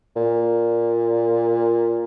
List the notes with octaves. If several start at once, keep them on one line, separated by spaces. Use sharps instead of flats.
A#2